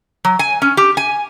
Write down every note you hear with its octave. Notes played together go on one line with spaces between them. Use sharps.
F#3
G#5
C#4
G4
G#5